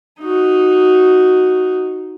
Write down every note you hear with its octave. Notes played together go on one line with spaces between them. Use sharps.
D#4 F#4